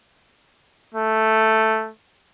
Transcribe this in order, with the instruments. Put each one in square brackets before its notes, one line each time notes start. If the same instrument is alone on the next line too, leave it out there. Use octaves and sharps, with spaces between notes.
[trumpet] A3